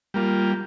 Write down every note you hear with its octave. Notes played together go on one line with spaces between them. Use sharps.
G3 A#3 F4